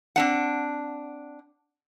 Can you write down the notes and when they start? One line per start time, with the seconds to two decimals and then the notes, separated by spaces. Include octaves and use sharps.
0.16 C4 D4 F#5